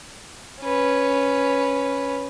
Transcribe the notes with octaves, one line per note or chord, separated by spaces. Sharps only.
C#4 B4